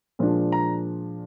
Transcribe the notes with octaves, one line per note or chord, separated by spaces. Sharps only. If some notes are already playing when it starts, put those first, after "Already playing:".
A#2 F3 G#3 D4
A#5